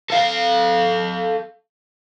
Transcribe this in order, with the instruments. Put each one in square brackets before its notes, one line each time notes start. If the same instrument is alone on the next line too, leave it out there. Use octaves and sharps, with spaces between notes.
[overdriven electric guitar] A4 F5